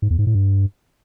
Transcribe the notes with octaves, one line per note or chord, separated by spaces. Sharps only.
G#2
E2
G#2
A2
G2